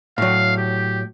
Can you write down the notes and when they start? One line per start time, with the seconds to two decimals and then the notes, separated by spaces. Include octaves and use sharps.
0.18 A2 F#3 F5
0.57 G4